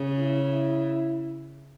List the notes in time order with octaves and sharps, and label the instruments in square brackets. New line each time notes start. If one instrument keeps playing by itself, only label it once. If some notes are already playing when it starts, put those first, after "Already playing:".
Already playing: [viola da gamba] C#3
[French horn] E4